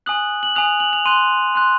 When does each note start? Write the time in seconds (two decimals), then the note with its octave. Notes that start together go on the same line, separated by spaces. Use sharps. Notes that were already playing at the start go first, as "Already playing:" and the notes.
0.06 G#5 D#6 F#6 F#7
0.43 F#7
0.56 G#5 D#6 F#6 F7
0.80 F#7
0.93 F7
1.05 C6 F#6 D#7
1.55 C6 F#6